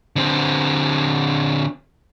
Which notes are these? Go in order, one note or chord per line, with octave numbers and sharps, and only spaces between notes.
D3 C4